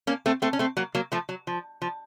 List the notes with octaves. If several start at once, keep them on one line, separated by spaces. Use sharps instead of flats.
A#3 C#4
A3 C4
A3 C4
C#4
A3 C4
F#3 A#3
F#3 A#3
F3 A3
F#3
F3
F3